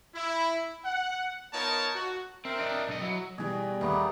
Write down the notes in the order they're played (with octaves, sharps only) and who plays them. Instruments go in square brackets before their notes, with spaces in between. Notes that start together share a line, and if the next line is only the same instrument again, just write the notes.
[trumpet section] E4
F#5
B3 D#4 F4 A#4 C#5 A5
F#4
[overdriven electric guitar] C4 [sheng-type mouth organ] A#4 E5 G5
[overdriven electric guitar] D4 D#5
B1 D#5
[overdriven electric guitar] F#3 [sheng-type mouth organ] E4 E5
[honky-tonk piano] B2 E3 [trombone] G3 [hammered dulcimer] G#4
[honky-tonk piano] D#2 [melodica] A3 B3 [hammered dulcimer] D#4 C#6 D6